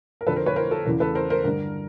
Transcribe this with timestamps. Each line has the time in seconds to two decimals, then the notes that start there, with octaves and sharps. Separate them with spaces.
0.21 A#4
0.27 F2 D3 A4 B4
0.36 A#4 C5
0.46 B4 C#5
0.56 A#4 C5
0.71 A4
0.86 E2 C#3 E3 A#4
1.00 A4 B4
1.15 A#4 C5
1.30 A#4 C5
1.44 G2 D3 A#4